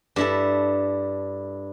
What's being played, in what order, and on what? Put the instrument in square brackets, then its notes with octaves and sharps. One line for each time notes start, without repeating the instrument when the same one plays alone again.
[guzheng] G2 E4 A4